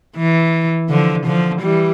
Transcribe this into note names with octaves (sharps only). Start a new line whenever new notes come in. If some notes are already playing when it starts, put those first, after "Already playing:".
E3
D3 F3
D3 F3
E3 G3